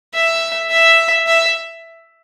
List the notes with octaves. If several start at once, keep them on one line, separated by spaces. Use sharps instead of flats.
E5
E5
E5